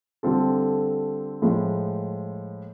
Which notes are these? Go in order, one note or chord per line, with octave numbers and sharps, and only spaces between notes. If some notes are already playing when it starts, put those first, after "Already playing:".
D3 G3 C4 F4 A4
A2 F3 G#3